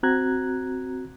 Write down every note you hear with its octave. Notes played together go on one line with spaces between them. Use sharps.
C4 F#4 A#5 F#6 G#6